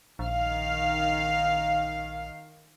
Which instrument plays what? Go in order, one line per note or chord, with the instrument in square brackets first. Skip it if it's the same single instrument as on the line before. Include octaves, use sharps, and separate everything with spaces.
[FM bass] A#1 [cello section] D#3 F5